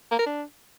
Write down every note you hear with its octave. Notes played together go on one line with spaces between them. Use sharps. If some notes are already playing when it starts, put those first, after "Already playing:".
A#3
A#4
D4